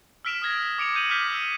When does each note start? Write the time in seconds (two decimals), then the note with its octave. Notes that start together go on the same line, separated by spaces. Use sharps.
0.25 E6 F6 B6 D7 E7 F7
0.42 D#6 F6 G#6 A#6
0.78 D6 C#7 D7 F7
0.95 G6 D#7 F7 F#7
1.10 D6 F6 G6 B6 F7
1.32 E6